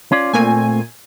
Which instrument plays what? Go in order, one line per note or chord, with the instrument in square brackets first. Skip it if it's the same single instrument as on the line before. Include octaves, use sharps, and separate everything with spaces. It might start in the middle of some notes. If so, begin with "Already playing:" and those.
[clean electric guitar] C#4 F4 D5
[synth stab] A#2 G#5 [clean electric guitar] A3 C4